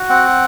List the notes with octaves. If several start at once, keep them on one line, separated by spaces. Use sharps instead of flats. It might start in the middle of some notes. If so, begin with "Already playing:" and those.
Already playing: F#4
C4 F#5